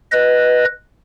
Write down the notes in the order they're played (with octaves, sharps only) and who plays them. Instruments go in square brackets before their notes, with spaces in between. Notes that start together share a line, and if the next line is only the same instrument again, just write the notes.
[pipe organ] B4 D#5